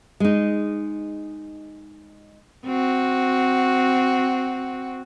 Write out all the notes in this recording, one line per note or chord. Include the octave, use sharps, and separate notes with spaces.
G#3 D#4
C4 F#4